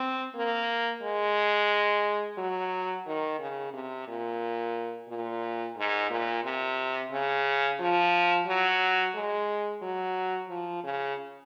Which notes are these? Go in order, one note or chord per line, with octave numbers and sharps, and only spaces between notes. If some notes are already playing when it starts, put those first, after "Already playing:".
Already playing: C4
A#3
G#3
F#3
D#3
C#3
C3
A#2
A#2
G#2
A#2
C3
C#3
F3
F#3
G#3
F#3
F3
C#3